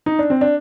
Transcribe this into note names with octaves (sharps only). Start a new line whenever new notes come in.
D#4
D4
C4
D4